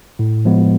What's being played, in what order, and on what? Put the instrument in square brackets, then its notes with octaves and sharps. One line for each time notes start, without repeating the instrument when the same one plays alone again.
[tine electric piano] A2
F3 G#3 B3